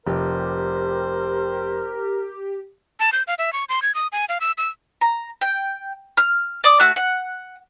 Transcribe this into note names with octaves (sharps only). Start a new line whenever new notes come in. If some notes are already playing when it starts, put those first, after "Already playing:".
F1 G4 A#4 C5
A5
G6
F5
E5
C#6
C6
G#6
D#6
G#5
F5
E6
E6
A#5
G5
F6
D5 D6 D#6
A3 F#4 F#6
F#5